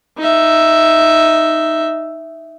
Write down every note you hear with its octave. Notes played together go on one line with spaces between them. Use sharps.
D#4 E5